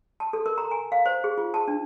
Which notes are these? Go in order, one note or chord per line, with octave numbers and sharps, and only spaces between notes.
A5
A4
A#4
A#5
G#5
F5
C5
G#4
F4
A5
D4